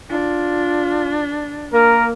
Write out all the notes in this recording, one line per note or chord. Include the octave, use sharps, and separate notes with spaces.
D4 F4
A#3 A#4